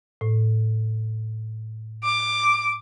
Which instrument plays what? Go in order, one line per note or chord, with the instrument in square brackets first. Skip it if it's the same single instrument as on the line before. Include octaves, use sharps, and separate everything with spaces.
[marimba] A2
[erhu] D6